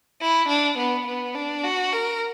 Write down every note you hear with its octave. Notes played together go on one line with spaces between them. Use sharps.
E4
D4
B3
B3
D4
F#4
A#4